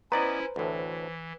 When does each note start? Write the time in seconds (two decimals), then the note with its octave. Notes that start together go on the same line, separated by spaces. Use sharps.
0.12 B3 C#4 E4 B4 C5 D5 D#5 A#5
0.56 D2 A2 E3